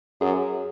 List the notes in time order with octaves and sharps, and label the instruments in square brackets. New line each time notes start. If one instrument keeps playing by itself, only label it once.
[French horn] F#2 [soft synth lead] G#4